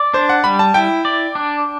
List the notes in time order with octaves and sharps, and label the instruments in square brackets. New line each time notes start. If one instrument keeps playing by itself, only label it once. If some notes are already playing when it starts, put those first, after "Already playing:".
Already playing: [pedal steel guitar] D5
[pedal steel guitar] D4 [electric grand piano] C5
[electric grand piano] F#5
[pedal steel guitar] G3 [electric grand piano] B5
[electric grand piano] A5
[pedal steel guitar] E4 [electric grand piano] G5
[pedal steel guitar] D5
D4